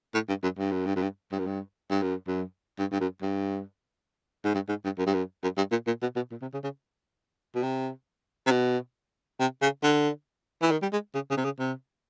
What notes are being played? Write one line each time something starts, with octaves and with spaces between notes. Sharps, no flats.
A2
G2
F#2
G2
F#2
G2
F#2
G2
G2
F#2
G2
G2
F#2
F#2
G2
G2
F#2
G2
G#2
G2
G#2
G2
F#2
G2
F#2
F#2
G2
A#2
A#2
B2
B2
A#2
C3
C#3
C#3
B2
C3
C3
B2
C3
C#3
D3
E3
D#3
G3
G#3
C#3
C#3
C3
C#3
C3